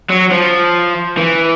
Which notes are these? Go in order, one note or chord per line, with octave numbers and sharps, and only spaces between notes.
F#3
F3
E3